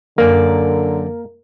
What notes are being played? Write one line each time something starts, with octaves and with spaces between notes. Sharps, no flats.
F#2 D3 A#3 A#4 D5